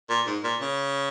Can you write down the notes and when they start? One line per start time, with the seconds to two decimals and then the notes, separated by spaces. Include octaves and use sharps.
0.09 A#2
0.27 G#2
0.44 A#2
0.61 C#3